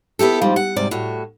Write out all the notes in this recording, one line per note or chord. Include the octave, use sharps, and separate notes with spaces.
B3 E4 G4 A4
G#2 F3 G3
F#5
G#2 C3 G3 D5
A2 F#4